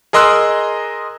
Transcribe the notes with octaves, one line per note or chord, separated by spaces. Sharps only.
G#4 A#4 D#5 C6 E6 F#6